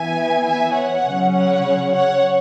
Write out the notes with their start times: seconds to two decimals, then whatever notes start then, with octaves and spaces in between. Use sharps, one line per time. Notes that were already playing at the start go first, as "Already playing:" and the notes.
Already playing: E3 B3 E5 G#5
0.45 E5 G#5
0.74 C#5 F#5
1.04 C#3 F#3 C#4
1.34 C#5 F#5
1.93 C#5 F#5